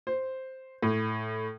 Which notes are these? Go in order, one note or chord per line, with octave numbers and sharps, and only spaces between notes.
C5
A2